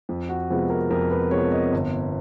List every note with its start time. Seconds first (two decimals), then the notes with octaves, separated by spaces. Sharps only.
0.09 F2
0.29 F#4
0.50 C3 F3 G#3 B3
0.70 A#4
0.90 F2 A#4
1.11 B4
1.31 C3 F3 G#3 B3 C#5
1.52 D#5
1.72 G1